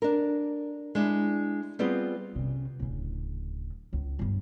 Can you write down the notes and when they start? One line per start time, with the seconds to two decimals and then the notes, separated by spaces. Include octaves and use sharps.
0.02 D4 A#4
0.95 G#3 D4 E4
1.79 G3 B3 C4 F4 G#4
2.35 C3 C#4
2.79 D1 C#3
3.93 C#2
4.19 G1 G2